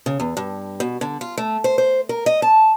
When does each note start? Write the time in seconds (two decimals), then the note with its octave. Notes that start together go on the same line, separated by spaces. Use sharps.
0.06 C#3
0.20 E2
0.37 G2
0.80 B2
1.01 D3
1.21 F4
1.38 A3
1.64 C5
1.78 C5
2.09 A#4
2.26 D#5
2.42 A5